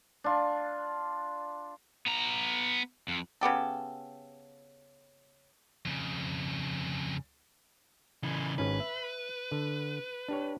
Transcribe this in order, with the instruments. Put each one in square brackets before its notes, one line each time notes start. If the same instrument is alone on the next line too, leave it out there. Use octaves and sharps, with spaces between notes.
[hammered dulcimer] D4 F4
[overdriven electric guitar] B3 A#5
F2
[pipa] C#3 B3 G4 A4
[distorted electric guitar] F2 C#3
[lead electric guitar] C#3 E3
[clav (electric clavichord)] G#1 C#4 D#4 [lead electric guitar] B4
[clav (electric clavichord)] E5
D3
D4 G4 C#5